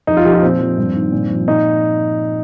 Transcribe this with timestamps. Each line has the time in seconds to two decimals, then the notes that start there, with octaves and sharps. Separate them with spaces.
0.07 F2 D#4
0.17 F4
0.25 F3 G4
0.34 F4
0.43 A#2 C4
0.60 F3
0.78 G2
0.95 D#3
1.12 A#2
1.30 F3
1.47 A#2 D#4